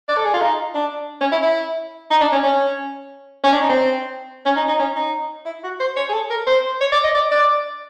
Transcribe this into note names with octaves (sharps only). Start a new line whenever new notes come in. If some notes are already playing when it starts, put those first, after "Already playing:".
D5
A4
G#4
F4
D#4
D4
C#4
E4
E4
D#4
D4
C#4
C#4
C#4
D4
D#4
C4
C#4
D#4
D#4
C#4
D#4
E4
F#4
C5
C#5
G#4
A4
A#4
C5
C#5
D5
D#5
D5
D5